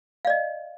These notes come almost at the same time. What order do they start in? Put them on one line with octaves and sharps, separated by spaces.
F5 D5 D#5